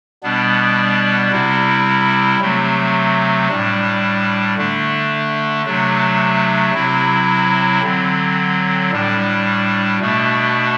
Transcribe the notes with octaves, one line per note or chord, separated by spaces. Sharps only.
B2 G3 B3 D4
C3 G3 C4 E4
C3 F#3 A3 C4
A2 G3 D4
D3 A3 D4
C3 F#3 A3 D4
C3 F#3 C4 E4
D3 F#3 C4
A2 G3 D4
B2 A3 D4